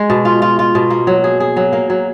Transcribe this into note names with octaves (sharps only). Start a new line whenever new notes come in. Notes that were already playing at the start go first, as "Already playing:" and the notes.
Already playing: G#3
B2
F4
F4
F4
B2
A#3
F#3
G#4
G#4
F#3
A#3
F#3